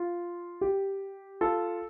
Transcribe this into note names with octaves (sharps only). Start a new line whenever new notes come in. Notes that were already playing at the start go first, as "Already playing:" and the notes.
Already playing: F4
G4
F4 A4